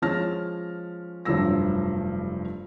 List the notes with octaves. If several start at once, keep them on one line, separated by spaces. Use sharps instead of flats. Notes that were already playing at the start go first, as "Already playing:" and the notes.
F3 G#3 C#4 A5 F6 A#6
F1 G2 F3 F#3 E6 A#6